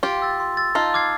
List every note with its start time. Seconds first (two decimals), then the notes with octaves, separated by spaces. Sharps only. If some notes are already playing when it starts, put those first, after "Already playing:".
0.03 F4 G4 C6
0.22 E6 A6
0.40 C6
0.57 E6 A6
0.75 D#4 F4 A5
0.94 D6 F6 G#6 C7